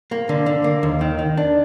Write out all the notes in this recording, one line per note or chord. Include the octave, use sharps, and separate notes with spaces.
A#3
D3
D3
A#3
D#2
D#3
D#3
D4